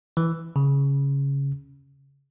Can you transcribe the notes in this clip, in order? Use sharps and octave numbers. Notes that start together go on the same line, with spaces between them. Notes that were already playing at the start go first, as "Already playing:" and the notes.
E3
C#3